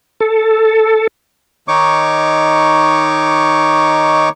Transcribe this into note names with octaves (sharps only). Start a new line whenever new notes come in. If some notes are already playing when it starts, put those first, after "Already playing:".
A4
D#3 D#4 C#5 C#6 D6